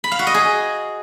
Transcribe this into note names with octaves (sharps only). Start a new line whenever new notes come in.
B5
F5
F#4
D#5
G#4